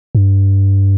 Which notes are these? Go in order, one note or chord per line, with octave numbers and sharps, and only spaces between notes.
G2